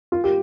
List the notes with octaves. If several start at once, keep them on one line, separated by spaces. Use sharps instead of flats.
F4
G4